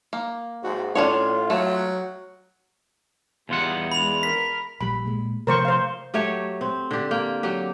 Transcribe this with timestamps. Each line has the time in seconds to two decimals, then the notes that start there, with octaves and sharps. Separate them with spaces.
0.13 A#3
0.64 G#2 F#4
0.95 A2 C#4 D4 F4 C#5
1.50 F#3 A3
3.49 E2 G3 D#4 F4 F#5
3.92 G#3 D4 B5 F7
4.23 A#4 B6
4.81 A#1 G3 B5
5.06 A#2 G#3
5.47 C3 F3 A3 A#4 C5 C#6
5.65 C5 F5
6.14 F#3 A3 G4 C#5
6.61 C4
6.91 D3 G4
7.11 A#3 G5
7.43 F#3 G4